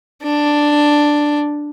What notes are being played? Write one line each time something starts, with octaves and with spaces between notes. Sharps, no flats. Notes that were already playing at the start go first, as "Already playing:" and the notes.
D4